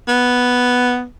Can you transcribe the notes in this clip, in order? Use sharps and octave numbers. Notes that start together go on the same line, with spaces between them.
B3